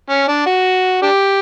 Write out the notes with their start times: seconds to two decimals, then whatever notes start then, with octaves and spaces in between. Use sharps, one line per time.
0.10 C#4
0.28 D4
0.46 F#4
1.03 D4 G4